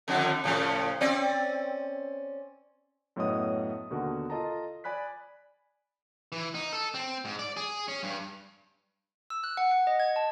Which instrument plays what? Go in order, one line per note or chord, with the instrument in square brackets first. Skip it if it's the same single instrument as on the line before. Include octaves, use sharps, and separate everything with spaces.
[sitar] F2 D3 D#3
A2 C#3 F3
C4 C#4 D5
[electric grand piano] F#2 A2 B3 C#5 D#5 D#6
D#2 B2 D3 F#4 A#4
F4 A4 D#5 A5 A#5
D5 G#5 B5 F#6 B6
[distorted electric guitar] E3
D#4
A4
C4
G#2
D5
G#4
C#4
G2
[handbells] E6
F#6
F#5
F#5
D#5
G#6
A5